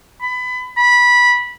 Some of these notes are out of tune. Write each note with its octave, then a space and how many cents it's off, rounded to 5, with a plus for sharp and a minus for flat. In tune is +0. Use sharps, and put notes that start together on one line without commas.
B5 +25
B5 -15